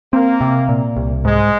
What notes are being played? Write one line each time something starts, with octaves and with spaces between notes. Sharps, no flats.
A#3 C4
C3
A#2
C2
G#2 G#3